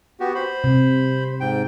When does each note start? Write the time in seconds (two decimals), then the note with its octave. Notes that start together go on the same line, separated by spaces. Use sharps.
0.20 B3 F#4 G4
0.35 C5 B5
0.64 C3
1.41 G#2 G5